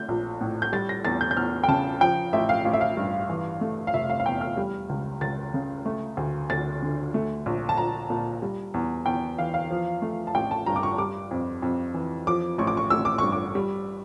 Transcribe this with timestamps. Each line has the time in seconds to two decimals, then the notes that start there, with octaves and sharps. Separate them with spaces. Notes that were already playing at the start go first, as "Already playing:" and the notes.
Already playing: A3 G6
0.09 A#1
0.41 A2
0.62 G6
0.72 G3 A6
0.89 A#6
1.05 E2 A6
1.21 G6
1.31 G6
1.37 E2 F6
1.64 G5
1.68 C#3 A5
2.01 F3 G5
2.33 A1 E5
2.49 F5
2.65 A1 F5
2.73 E5
2.81 F5
2.97 G2
3.29 E3
3.61 A3
3.87 F5
3.94 F1 E5
4.10 F5
4.20 F5
4.26 E2 G5
4.41 F6
4.57 G3
4.89 C#2
5.21 C#2 A6
5.54 C#3
5.86 A3
6.17 D2
6.50 D2 A6
6.82 D3
7.14 A3
7.46 A#1
7.69 A5
7.78 A#1 A#5
8.10 A#2
8.42 G3
8.74 E2
9.06 E2 G5
9.38 E3 F5
9.54 F5
9.70 F3
10.02 A3
10.27 A5
10.34 A1 G5
10.51 A5
10.66 G2 A#5
10.76 D6
10.83 C#6
10.98 G3 D6
11.31 F2
11.62 F2
11.94 E3
12.27 F3 D6
12.58 A1 C#6
12.67 D6
12.77 C#6
12.90 A1 E6
13.05 D6
13.18 G2 C#6
13.32 D6
13.55 G3